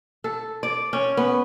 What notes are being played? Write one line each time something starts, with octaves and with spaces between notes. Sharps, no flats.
A4
D5
C#4
B3